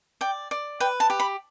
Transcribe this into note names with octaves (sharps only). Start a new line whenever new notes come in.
D5 G5
D5
B4 G5
A5
G4
B5